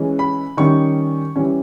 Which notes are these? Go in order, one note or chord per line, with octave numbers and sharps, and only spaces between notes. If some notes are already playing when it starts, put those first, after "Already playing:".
Already playing: E3 G#3 C#4
B5
D#3 G3 C#4 C#6
E3 G3 C#4